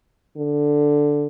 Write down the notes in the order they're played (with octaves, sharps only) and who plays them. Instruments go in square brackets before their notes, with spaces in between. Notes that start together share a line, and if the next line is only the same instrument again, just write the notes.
[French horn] D3